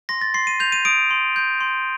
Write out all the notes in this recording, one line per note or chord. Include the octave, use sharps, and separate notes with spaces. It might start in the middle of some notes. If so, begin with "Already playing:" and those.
C6 A#6
A6
C6 C7
D#7
G6 F7
D#7
D#6 D7
C6
G6
C6